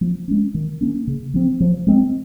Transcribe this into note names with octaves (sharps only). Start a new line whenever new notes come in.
F3
G#3 C#4
D#3
A#3 C#4
C#3
F3 C4
F3
G#3 C4